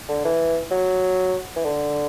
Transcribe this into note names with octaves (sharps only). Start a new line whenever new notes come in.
D3
E3
F#3
E3
D3